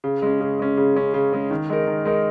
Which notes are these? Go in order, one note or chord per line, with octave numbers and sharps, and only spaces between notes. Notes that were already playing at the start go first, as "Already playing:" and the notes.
C#3
G#3 C#4
C#3
G#3 C#4
C#3
G#3 C#4
C#3
G#3 C#4
D#3
G#3 D#4 A#4
D#3
G#3 D#4 A#4